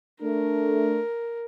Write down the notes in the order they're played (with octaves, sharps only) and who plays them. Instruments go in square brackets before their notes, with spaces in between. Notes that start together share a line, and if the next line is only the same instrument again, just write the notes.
[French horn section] A3 D4 [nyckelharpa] A#4